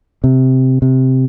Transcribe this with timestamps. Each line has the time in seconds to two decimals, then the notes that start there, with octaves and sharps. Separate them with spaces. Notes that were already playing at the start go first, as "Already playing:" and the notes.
0.24 C3
0.82 C3